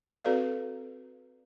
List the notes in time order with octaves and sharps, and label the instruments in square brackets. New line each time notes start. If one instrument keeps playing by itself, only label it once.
[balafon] C4 F#4 A4 B4 D5 F5